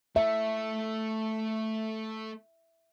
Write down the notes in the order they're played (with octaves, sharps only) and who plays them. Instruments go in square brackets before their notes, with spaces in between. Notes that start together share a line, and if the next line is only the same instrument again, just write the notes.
[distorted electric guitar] A3 [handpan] E5